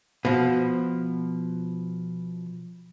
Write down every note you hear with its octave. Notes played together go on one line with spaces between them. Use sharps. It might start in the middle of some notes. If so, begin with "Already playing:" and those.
B2 F3